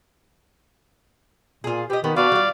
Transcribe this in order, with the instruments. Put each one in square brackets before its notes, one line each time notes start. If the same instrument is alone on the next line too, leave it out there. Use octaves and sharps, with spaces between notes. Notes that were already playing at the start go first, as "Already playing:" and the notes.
[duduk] A#2 [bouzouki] F4 G#4
[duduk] G4 [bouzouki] B4 D#5
[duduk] D#3 [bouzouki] B3 G4 F#5
[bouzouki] B3 D4 B4 [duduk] F#4 [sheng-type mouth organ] D5 F5
[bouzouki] G3 F4